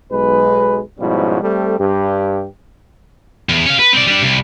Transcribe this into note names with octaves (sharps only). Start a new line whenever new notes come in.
B1 G#3 B4
G#2 B2 F3 G3 C#4 E4
G3 A3 C4 A4
G2 G4
E2
C#4 F5
B4
C4 D5
G3 D4
C2